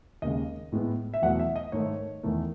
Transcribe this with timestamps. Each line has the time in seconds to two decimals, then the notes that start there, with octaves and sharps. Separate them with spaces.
0.22 D#2 C#3 G#3 D#5
0.72 A2 G#3 B3
1.14 E5
1.22 E2 B2 F#3 A3 F#5
1.40 E5
1.56 D#5
1.72 G#2 D#3 A3 C#5
2.23 E2 D#3 A3